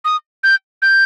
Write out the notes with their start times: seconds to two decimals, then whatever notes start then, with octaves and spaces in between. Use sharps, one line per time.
0.05 D#6
0.43 G6
0.82 G6